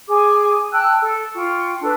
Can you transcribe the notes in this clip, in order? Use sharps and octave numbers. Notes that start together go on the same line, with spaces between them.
G#4 G#5 D6
G5 A5 E6 F#6
A4
F4 G5 C#6
D4 A4 B4